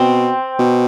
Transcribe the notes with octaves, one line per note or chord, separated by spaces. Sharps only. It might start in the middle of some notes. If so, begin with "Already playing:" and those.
Already playing: B2 C4
B2